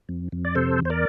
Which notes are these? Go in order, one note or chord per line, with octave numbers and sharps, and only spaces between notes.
F2
F2
D5
C3 A4 C5
E2
C5
A#4 D5